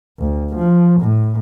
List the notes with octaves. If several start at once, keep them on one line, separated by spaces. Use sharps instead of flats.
D2
F3
A2